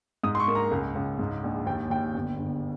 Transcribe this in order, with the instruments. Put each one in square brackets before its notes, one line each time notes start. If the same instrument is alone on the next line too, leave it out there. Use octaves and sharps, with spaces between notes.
[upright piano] G#2 D#6
C6
C#6
A#3
A#5
C#2
C#2
G#2
A#1
D#2 G5
D#2 G5
G1
G1